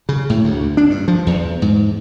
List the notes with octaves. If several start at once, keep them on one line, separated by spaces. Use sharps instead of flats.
C#3
A2
D2
D4
G2
F3
E2
G#2